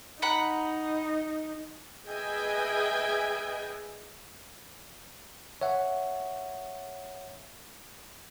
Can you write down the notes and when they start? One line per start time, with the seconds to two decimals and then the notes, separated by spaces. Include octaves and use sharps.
0.22 D#4 F#5 A#5 B5
2.08 G#4 B4 D#5 E5 G5 G#5
5.61 C#5 E5 F#5